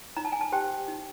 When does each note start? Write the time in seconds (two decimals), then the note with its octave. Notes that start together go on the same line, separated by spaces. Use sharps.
0.17 D#4 A#5
0.25 A5
0.32 G#5
0.41 A5
0.52 G4 C5 G5
0.88 D#4